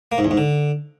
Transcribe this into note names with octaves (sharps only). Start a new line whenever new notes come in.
A#3
G#2
E2
G#2
D3